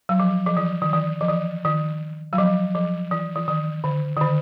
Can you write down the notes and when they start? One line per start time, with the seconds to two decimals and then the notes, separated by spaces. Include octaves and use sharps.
0.09 F#3
0.20 F3
0.46 F3
0.57 E3
0.82 D#3
0.93 E3
1.21 F3
1.29 E3
1.65 D#3
2.33 F#3
2.38 F3
2.75 F3
3.11 E3
3.35 E3
3.48 D#3
3.84 D3
4.17 D#3
4.21 D3